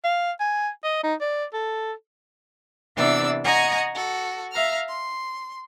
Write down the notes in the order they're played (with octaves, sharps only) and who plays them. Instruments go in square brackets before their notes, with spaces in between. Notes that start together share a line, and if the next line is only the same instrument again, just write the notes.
[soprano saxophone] F5
G#5
D#5
D#4
D5
A4
[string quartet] C3 E3 B3 D4 D5 E6
D#5 F#5 G#5 A#5 C#6 D#6
F#4 A4
E5 F5 A#5 F6
C6